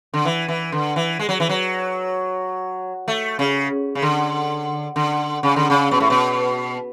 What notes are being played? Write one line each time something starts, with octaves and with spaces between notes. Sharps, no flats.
D3
E3
E3
D3
E3
G#3
F#3
E3
F#3
A3
C#3
C#3
D3
D3
C#3
D3
C#3
B2
A2
B2